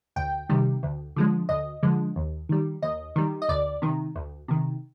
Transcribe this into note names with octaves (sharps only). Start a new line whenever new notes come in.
D2 G5
C3 D#3 G3
D2
D3 F3 G#3
D2 D#5
D3 F3 G#3
D#2
D#3 G3
D#2 D#5
D#3 G3
D#5
D2 D5
C3 D#3
D2
C3 D#3